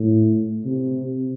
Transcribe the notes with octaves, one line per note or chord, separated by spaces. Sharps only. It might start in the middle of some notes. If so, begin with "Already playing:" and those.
Already playing: A2
C3